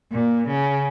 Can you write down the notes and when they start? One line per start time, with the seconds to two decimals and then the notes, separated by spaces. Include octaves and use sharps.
0.12 A#2
0.47 C#3